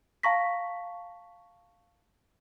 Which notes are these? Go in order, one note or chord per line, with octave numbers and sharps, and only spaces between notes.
F5 A5 A#5 C#6 A#6 B6